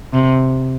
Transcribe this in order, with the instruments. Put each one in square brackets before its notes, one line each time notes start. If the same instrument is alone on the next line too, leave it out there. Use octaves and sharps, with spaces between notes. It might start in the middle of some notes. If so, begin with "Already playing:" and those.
[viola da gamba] C3